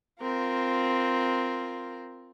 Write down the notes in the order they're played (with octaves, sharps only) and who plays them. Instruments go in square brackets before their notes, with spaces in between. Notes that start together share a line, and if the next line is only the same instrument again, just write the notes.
[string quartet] C4 F4 A#4